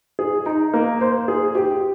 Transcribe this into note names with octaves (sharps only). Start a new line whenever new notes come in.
G#4
D#4
A#3
C5
G#4
G4